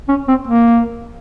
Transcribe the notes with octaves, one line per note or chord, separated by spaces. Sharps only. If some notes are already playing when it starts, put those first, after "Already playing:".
C#4
C4
A#3